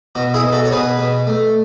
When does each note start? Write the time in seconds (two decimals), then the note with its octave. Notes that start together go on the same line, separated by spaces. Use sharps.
0.15 B2 F#4
0.34 E4 G#4
0.43 B2
0.52 F#4 A4
0.65 C#5
0.71 B2 G#4 B4
0.99 B2
1.27 A3